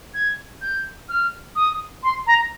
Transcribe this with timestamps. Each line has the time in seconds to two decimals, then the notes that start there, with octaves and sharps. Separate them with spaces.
0.14 G#6
0.61 G6
1.09 F6
1.56 D#6
2.03 C6
2.27 A#5